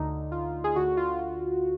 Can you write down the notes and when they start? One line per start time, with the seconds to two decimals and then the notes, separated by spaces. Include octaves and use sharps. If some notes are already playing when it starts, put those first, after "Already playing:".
Already playing: D2 D3 D#4
0.32 F4
0.64 G#4
0.76 D2 D3 F#4
0.97 F4
1.19 F4